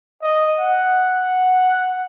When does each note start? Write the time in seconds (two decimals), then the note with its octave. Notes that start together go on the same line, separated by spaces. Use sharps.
0.22 D#5
0.59 F#5